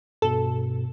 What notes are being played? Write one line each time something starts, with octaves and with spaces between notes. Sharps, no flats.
G2 B2 A4